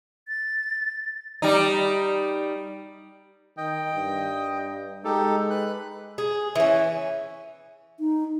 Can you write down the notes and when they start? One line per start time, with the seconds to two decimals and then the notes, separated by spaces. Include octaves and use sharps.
0.28 A6
1.42 G3 D#4
3.57 D#3 D#5 G5
3.94 G2
5.04 G#3 D#4 G4 A4
5.50 B4 F#6
6.18 G#4
6.56 E3 C#4
8.00 D#4